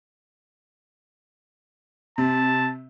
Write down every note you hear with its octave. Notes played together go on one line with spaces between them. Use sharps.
C3 A5